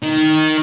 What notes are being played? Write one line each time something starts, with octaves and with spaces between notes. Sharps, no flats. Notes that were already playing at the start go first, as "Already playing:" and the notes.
D#3